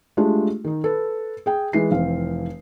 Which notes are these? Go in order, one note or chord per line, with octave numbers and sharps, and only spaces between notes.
G#3 A3 D4 F4 G4
D#3 D#4
A4 B4
G#4 G5
E3 G#3 C7
F1 E3 C4 F5